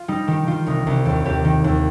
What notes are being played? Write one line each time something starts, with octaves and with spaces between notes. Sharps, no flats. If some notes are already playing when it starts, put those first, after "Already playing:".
Already playing: F4
G3 D#4
D#3 G4
D#3 F4
C2 D#4
C2
D#2 G4
D#2 G4
D#3
D#2